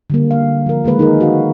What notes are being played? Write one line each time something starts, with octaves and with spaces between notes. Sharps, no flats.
D3 G3 A#3
F5
F3 A#4
D#3 G#3 A#3 B4
D#4 G#4 A#4
F#4 F5